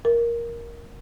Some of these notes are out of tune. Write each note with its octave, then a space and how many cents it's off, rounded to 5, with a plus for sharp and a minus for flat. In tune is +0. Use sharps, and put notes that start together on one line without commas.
A#4 +10